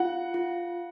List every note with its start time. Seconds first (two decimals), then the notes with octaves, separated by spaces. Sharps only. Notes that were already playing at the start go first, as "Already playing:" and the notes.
Already playing: F4 F#5
0.34 F4